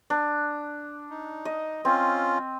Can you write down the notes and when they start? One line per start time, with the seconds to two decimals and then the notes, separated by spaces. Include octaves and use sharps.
0.10 D4
1.10 D#4
1.45 D#5
1.85 C4 C#4 F4